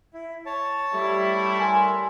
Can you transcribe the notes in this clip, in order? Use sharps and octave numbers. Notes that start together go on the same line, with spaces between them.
E4
C#5 A5
G3 A3 E4
A#4 G#5 C6